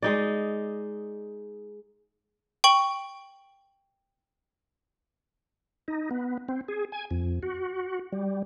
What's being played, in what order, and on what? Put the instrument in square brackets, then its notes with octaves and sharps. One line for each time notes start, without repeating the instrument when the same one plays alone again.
[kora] G#3 D#4 D5
[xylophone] G5 C#6 F#7
[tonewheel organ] D#4
B3
C4
G#4
G#5
F2
F#4
G3